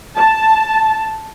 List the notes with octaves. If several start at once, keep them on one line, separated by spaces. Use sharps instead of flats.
A5